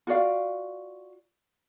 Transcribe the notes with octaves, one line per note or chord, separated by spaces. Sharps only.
F4 F#4 D5 F5